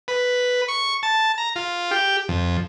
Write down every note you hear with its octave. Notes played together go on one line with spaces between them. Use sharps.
B4
C#6
A5
A#5
F4
G4
F2